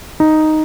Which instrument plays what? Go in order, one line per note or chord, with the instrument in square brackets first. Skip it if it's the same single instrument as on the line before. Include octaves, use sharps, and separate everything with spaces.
[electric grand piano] D#4